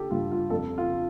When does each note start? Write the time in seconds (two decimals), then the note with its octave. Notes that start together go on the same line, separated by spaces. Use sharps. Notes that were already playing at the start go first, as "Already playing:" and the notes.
Already playing: D3 G4 A4
0.11 G2 F4
0.32 F4
0.50 F2 A4
0.78 F4